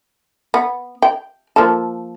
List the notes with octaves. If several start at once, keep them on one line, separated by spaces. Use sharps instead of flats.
B3
G5
F3 A#3 A4